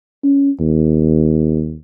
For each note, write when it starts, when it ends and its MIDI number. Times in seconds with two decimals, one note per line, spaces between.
0.24 0.51 61
0.60 1.76 39